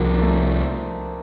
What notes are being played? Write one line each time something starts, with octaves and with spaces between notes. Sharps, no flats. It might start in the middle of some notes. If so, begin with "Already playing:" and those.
Already playing: C2 C3 F3 A#3 C4 D4 D#4
A3